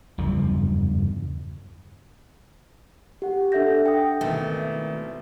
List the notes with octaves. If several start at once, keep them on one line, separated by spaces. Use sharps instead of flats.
F#1 E2 G2 F3
G4 F#5
D4 A4 E5 F#5 G6 A#6
G5 D#6
G#1 B2 D#3 E3 A3